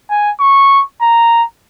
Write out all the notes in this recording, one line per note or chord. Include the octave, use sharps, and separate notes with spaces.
G#5
C#6
A#5